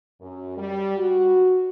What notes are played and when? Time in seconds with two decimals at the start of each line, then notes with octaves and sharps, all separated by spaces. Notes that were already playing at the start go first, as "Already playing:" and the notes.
0.21 F#2
0.57 G3
0.98 F#4